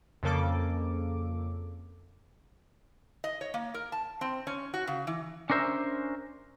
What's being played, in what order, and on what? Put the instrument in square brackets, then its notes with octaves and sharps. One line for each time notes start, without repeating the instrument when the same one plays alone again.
[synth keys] F2 C#3 A#3 A4 D6
[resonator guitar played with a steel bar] D#5
C#5
A#3
A#4
A5
C4
C#4
F#4
C#3
E3
[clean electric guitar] C#4 D4 A#4 C5 E5